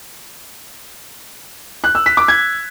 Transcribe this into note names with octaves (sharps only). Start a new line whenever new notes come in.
F#6
E6
B6
D6
G#6